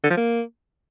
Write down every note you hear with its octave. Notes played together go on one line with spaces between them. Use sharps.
D3
F3
A#3